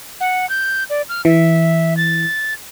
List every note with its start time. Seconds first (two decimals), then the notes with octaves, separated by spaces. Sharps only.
0.20 F#5
0.50 G6
0.90 D5
1.09 F6
1.25 E3 E5
1.97 A6